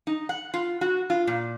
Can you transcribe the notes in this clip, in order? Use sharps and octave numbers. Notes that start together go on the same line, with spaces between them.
D#4
F#5
F4
F#4
F4
A#2